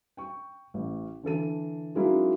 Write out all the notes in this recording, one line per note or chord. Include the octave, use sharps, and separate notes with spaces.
G5 C#6
A1
D3 E3 A4 D#7
F#3 G#3 A#3 C#4 D#4 E4